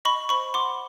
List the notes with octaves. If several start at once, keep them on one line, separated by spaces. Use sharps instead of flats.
D#5 B5 C#6
C5 B5 C#6
F#5 C6 D6